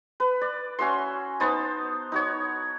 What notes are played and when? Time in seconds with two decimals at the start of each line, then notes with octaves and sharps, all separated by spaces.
0.20 B4
0.41 D5
0.79 C#4 F#4 E5 C6
1.40 B3 D#4 C5 A5
2.12 D#4 F#4 C#5